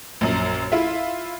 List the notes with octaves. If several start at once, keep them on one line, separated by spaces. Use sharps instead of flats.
A#1 F#2
E4 F4 E5